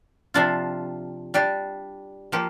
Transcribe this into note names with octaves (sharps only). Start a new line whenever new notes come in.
C3 F3 D4 F4
G3 D4 G4
F3 A#3 G4